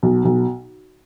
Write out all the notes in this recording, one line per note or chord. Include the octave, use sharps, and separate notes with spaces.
B1
B1